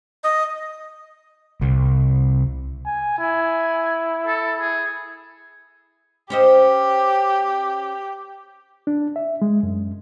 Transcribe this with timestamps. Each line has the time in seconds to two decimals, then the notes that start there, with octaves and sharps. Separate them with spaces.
0.24 D#5
1.62 C2
2.86 G#5
3.18 E4 G#5
4.27 A4
4.60 G#4
6.30 C#4 G4 C5 D#5
8.87 D4
9.16 E5
9.42 G#3
9.63 F#2